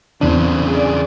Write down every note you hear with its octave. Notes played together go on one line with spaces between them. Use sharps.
E2 C#3 E3 C4 D4
G#4 D5